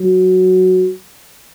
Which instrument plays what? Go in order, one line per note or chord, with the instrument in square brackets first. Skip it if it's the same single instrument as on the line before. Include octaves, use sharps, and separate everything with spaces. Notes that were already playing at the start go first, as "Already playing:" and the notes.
Already playing: [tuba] F#3